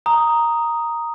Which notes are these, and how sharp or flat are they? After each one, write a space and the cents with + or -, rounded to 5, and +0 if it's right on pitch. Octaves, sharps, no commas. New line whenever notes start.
A#5 +0 D#6 +0